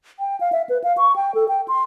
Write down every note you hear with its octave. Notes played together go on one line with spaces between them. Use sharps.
G5
F5
E5
B4
F5
C#6
G5
A4
G5
C6